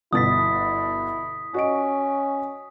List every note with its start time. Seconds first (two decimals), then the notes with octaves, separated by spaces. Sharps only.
0.13 G1 B2 E4 D#6 A6 B6
1.54 C#4 F#4 D#5 D7